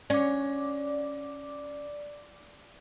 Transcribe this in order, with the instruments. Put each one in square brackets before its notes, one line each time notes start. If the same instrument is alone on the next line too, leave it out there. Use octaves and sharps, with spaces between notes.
[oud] C#4 [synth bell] D5 D6